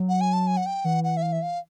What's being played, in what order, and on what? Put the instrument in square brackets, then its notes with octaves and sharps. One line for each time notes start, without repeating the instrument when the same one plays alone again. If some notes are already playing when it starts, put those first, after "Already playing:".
Already playing: [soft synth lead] F#3
[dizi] F#5
G#5
A5
G#5
F#5
G5
[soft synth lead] E3 [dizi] F#5
[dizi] F#5
E5
F5
E5
F5